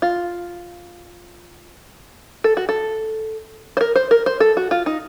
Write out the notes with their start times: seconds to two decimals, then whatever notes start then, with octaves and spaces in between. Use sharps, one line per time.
0.02 F4
2.44 A4
2.57 F#4
2.69 A4
3.77 C5
3.81 A#4
3.96 C5
4.11 A#4
4.26 C5
4.40 A4
4.57 F#4
4.71 F4
4.86 D#4